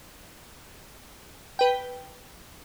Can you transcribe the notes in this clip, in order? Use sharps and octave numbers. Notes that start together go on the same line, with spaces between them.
B4 G5